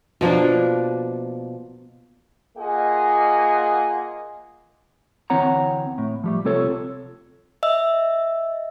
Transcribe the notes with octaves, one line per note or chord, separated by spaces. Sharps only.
B2 F3 A#3 D4
A#3 F4 G#4 D#5 F#5 G#5
D2 E3 C4 C#5 F#5 A#5
A2
F3 G3 A3
C2 C4 F4 A4 C#5
D#5 E5 E6